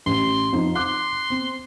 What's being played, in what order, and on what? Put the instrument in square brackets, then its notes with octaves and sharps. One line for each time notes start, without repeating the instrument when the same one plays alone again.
[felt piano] A1 [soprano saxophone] C6
[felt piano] F2 D#4
[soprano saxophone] C6 [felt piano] D6 F#6
[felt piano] C4